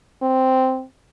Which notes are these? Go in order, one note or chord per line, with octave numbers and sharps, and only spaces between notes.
C4